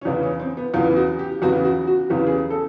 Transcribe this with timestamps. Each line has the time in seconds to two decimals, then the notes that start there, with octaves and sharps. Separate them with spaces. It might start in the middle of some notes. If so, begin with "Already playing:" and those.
0.01 C#4
0.05 E2 C#3 E3 D4
0.23 C#4
0.40 C4
0.57 B3
0.74 E2 C#3 E3 F4
0.96 F#4
1.19 G4
1.42 E2 C#3 E3 F#4
1.65 F#4
1.87 F#4
2.10 E2 C#3 E3 G4
2.27 G#4
2.50 A4